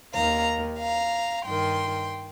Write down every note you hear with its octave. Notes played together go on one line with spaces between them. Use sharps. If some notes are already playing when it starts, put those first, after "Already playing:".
D#2 D#3 F5 A#5
F5 A#5
G2 D#3 G5 C6